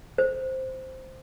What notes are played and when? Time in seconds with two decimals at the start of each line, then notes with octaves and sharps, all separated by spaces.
0.18 C5